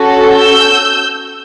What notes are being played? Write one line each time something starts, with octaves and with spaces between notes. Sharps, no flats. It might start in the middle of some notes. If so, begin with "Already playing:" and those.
Already playing: C#4 F#4 A4
E6 G6